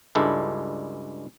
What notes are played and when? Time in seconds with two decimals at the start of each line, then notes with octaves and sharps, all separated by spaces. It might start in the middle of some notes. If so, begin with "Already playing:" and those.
0.15 C#2 G2 G#3 D4 E4 A4